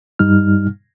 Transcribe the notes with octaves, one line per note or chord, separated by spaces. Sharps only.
G2 G3 D#4 F6